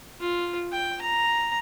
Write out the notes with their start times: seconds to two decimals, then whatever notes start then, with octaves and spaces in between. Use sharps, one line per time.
0.20 F4
0.72 G5
1.01 A#5